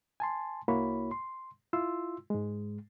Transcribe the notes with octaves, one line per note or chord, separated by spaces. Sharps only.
G#5 A5 C6
C2 A#3 E4 F#4 C#5 B5
C6
E4 F4 C6 E6
G#2 G#3